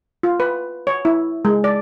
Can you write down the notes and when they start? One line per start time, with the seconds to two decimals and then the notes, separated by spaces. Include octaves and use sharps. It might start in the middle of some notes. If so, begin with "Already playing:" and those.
0.23 F4
0.40 B4
0.87 C#5
1.05 E4
1.45 G#3
1.64 D5